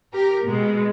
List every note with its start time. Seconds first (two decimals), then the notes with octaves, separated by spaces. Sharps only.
0.13 G4 A#4
0.43 B2 G#3